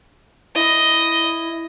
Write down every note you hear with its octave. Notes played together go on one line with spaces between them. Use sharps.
E4 D#5